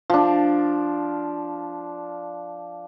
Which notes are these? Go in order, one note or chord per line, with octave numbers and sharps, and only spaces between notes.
F3 D4